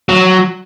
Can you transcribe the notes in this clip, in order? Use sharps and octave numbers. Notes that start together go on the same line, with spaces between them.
F#3